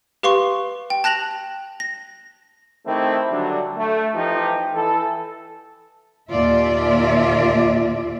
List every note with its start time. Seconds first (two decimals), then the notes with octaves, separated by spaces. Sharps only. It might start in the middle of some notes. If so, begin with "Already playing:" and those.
0.23 G4 B4 F5 C6 C#6
0.90 G5
1.04 A5 F#6 A#6 F7 F#7
1.80 A#6
2.86 D#3 A3 C4 E4 G4
3.30 D3 F#3 G3 D4 A4
3.77 A3
4.15 E3 F3 D#4 G4
4.74 E3 A4
6.30 D#2 A#2 F4 D5 E5